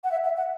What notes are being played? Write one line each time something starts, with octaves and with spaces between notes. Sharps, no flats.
F#5
E5
E5
F#5